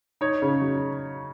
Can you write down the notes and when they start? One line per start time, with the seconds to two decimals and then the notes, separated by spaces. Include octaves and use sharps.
0.21 D#4 C#5
0.42 C#3
0.61 F#3